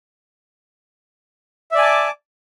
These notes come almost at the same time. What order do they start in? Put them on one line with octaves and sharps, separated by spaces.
E5 D5 G#5 A5 D6